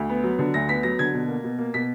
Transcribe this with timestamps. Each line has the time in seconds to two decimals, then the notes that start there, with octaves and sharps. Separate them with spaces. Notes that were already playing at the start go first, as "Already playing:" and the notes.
Already playing: D2
0.10 B3
0.24 F#3
0.39 D3
0.54 D2 A#6
0.69 B3 B6
0.83 F#3 A#6
0.99 D3 G#6
1.13 B2
1.28 A#3
1.44 B2
1.59 A#3
1.74 B2 B6